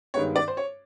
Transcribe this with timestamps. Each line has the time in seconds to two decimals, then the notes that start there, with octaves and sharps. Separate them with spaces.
0.14 G2 D#3 G#3 B3 C#5
0.36 D5
0.48 C5
0.57 C#5